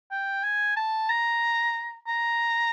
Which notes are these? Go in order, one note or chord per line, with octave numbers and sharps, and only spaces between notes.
G5
G#5
A5
A#5
A#5